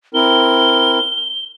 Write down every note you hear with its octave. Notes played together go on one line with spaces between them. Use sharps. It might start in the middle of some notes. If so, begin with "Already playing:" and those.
C4 E4 A#4 G7